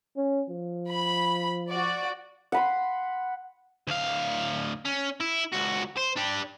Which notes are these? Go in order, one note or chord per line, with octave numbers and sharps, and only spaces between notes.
C#4
F3
B5
F#4 D5
F#5 B5 C6
D2 F5
C#4
E4
C#2 F#4
C5
D4 G4